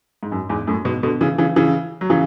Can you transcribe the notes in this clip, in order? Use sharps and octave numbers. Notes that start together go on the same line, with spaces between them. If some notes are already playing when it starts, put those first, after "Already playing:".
G#2
F#2
E2 G#2
F#2 A2
G#2 B2
B2 D3
C#3 E3
C#3 E3
C#3 E3
F#3
C#3 E3